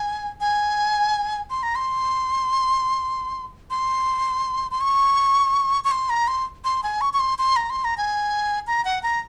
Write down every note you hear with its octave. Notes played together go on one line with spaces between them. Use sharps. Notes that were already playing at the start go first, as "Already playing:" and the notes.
Already playing: G#5
G#5
C6
A#5
C6
C6
C6
C#6
C#6
C6
A#5
C6
C6
G#5
C#6
C#6
C6
C6
A#5
C6
A#5
G#5
A#5
F#5
A#5